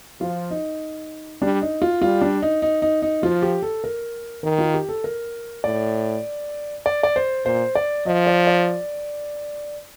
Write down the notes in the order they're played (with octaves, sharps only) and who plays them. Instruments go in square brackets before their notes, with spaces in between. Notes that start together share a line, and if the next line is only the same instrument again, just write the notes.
[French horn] F3 [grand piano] F4
[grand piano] D#4
[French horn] G3 [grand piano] D4
[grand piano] D#4
F4
[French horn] G3 [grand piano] F4
[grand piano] D4
D#4
D#4
D#4
D#4
[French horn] F3 [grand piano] F4
[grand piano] G4
A4
A#4
[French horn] D#3 [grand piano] A#4
[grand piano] F4
G4
A4
A#4
[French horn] A2 [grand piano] D5
[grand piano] D5
D5
C5
[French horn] A#2 [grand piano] C5
[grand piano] D5
[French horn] F3 [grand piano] D#5
[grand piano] D5
D5